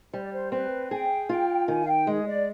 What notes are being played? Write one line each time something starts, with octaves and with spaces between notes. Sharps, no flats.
G3 C5
D5
C5
C4 B4
G#4 G5
F4
D#3 G#5
F5
G5
G#3 G#4
D5